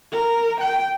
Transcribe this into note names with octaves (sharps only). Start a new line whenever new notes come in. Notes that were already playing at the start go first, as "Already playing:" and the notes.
A#4
G5